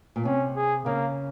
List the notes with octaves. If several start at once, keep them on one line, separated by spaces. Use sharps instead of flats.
A#2
C3 C#4
G#4
C#3 A#3